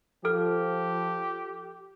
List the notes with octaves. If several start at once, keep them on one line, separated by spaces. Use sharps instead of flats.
F3 G4 A4 F6